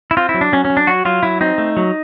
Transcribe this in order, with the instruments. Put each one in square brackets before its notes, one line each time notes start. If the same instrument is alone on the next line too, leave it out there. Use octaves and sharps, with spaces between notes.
[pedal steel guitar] E4
C4 F4
E4
F#3
D4
F#3 C#4
C#4
F#3
D4
F#3 F#4
F#3 F4
F#3 E4
C4 D#4
A3
F#3